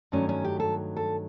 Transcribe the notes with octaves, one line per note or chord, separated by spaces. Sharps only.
G2 D#3 F#3 A3 C#4
C#4
G4
A4
A4